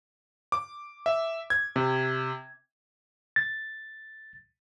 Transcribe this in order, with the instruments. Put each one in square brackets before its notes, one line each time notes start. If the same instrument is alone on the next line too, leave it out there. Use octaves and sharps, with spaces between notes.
[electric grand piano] D6
E5
G#6
C3
[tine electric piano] A6